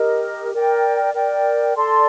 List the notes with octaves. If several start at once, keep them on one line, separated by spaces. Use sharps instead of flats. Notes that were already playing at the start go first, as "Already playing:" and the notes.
Already playing: G4 A#4 D#5
A#4 D5 G5
A#4 D5 G5
A4 D5 A5 C6